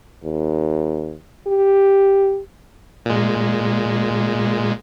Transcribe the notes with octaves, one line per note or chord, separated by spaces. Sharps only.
D#2
G4
A#2 G#3